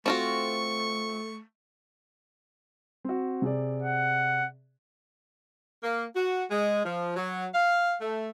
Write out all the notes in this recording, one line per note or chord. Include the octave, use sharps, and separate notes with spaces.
A3 C4 F4 F#4 C#6
C4 F#4
C3 G#4 D5
F#5
A#3
F#4
G#3
F3
F#3
F5
A3